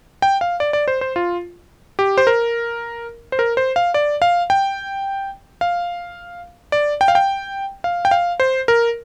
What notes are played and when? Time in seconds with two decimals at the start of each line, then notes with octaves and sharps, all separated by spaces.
0.22 G5
0.41 F5
0.60 D5
0.73 D5
0.88 C5
1.01 C5
1.16 F4
1.99 G4
2.18 C5
2.27 A#4
3.32 C5
3.39 A#4
3.57 C5
3.76 F5
3.94 D5
4.22 F5
4.50 G5
5.61 F5
6.72 D5
7.01 G5
7.08 F5
7.15 G5
7.84 F5
8.05 G5
8.11 F5
8.40 C5
8.68 A#4